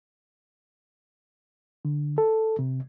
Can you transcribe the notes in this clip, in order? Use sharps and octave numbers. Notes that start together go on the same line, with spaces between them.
D3
A4
C3